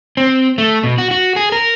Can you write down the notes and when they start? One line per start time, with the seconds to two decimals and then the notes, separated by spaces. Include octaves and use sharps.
0.17 C4
0.58 A3
0.84 B2
0.98 F#4
1.11 F#4
1.36 G#4
1.52 A#4